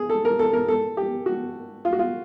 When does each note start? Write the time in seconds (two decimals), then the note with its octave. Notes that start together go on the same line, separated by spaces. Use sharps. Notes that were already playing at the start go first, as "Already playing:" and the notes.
Already playing: G#4
0.09 A4
0.25 A#4
0.39 A4
0.53 A#4
0.68 A4
0.97 G4
1.26 F#4
1.85 F4
1.93 F#4
1.99 F4